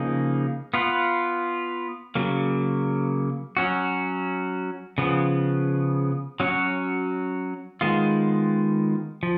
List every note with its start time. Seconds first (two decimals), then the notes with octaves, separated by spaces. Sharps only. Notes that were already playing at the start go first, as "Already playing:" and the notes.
Already playing: C#3 F3 A#3 D#4 G#4
0.74 B3 F4 B4
2.15 C#3 F#3 A#3
3.57 F#3 C#4 F#4
4.98 C#3 F3 B3
6.40 F#3 C#4 F#4 C#5
7.81 D#3 G#3 B3 F4
9.23 F3